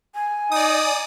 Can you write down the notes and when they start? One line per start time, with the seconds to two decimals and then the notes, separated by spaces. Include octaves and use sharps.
0.15 G#5
0.52 D#4 D5 D#6